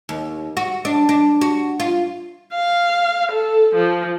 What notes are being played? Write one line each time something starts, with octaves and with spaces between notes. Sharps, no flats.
D#2
F#4
D4
D4
F#4
F4
F5
A4
F3